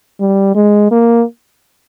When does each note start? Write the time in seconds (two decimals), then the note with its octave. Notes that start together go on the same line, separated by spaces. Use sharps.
0.20 G3
0.55 G#3
0.92 A#3